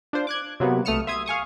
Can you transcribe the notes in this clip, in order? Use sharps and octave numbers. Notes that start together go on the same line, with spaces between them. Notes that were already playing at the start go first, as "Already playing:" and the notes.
D4 F4 C5
D6 F#6 G#6
C3 F#3 A#3 B3
B1 A3 D#6 F6 C#7 E7
E5 C6 D#6 G#6
F5 G#5 C#6 D#6